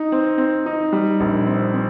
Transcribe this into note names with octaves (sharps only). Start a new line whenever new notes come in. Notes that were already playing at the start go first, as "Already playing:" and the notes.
Already playing: D#4
C4
C4
D#4
G3
A#1
C4
C4